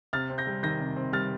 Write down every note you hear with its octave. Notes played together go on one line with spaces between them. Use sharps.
C3 F6 A6
C4
G6 A#6
G3
D#3 G6 A#6
C3
C4
G3 F6 A6